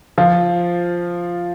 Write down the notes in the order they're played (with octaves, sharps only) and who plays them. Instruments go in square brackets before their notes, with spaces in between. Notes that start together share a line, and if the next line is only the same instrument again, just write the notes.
[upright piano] F3 F4